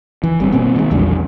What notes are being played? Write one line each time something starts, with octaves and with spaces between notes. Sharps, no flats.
E3
G1 G3 C4
B2 A#3 C4
D#3 G#3
A#1 E2 D3 G3